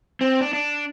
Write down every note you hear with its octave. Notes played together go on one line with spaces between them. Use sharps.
C4
D4
D4